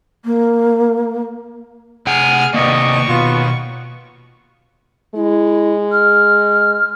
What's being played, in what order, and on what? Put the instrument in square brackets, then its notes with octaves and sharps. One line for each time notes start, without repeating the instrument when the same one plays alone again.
[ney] A#3
[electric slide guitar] C3 F#5 G#5 [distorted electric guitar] G#4 [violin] F6
[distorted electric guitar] D#2 G4 [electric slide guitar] C3 A#3 [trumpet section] B3 D5 D#5 [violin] C#6
[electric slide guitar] B2 [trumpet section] B3 F4
[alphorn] G#3 [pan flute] E4
[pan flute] F6